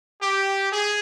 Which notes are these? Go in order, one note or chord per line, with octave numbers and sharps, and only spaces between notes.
G4
G#4